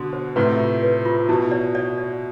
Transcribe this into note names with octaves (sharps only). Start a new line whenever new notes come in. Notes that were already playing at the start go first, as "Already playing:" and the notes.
Already playing: B2 D3 C6
C5
A2 C3 B4
F4
B4
F4
B2 E4
D5
D5
D5